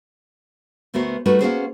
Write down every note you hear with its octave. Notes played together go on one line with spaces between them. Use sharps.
D2 A3 B3 F#4 A#4 C5
G3 A3 D#4 F#4 A#4 B4
A#3 B3 C#4 F#4 G#4 C5